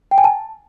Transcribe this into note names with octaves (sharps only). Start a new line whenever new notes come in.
G5
G#5
A5